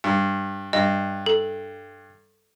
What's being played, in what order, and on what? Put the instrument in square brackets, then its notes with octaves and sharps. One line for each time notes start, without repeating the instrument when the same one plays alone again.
[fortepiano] G2
[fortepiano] G2 [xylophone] D#5
[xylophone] A4